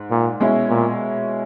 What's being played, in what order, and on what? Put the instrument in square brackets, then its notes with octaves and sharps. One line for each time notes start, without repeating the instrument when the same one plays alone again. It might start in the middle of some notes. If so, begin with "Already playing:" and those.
Already playing: [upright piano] G#2
[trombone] A#2
[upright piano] B2 G#3 C#4 E4
[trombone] A#2